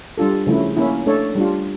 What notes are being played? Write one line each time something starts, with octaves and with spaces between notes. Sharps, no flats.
G3 D4 F4 A4
C#3 F3 A3 E4
A#3 C#4 E4
A3 D4 A4 C#5
G3 D4 F4